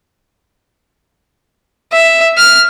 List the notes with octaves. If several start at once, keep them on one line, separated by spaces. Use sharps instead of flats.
E5
F6